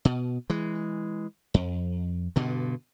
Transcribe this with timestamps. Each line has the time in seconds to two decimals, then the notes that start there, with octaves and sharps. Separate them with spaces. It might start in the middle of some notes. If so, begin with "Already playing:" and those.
0.05 B2
0.50 E3 G#3
1.54 F2
2.36 G2 B2 D3